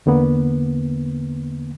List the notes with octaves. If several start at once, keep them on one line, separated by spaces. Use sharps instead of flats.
E2 D3 A#3 B3